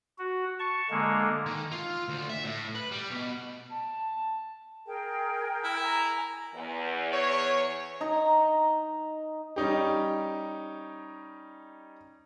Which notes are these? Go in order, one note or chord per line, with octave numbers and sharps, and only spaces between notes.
F#4
A5 C#6
D3 G#3 A#3
D#3
F4
D2
E5
A2
B4
G3
B2
A5
G#4 A#4 G5
E4
G#5 A#5
E2
C#5
D#4 A#5
G3 C#4 D#4 G4